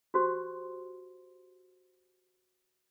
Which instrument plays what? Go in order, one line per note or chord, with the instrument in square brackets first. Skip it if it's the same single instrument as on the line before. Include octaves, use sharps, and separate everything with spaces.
[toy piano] F#4 G4 C5 C6